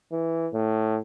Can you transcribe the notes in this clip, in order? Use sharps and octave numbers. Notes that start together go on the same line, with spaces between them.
E3
A2